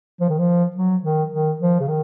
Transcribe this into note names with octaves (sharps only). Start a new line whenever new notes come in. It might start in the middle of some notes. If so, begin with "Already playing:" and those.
F3
D#3
F3
F#3
D#3
D#3
F3
C#3
D#3